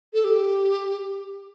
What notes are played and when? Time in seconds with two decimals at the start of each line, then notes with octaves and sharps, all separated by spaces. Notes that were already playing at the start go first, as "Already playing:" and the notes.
0.13 A4
0.24 G4